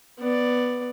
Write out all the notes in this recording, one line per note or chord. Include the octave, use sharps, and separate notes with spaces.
B3 D5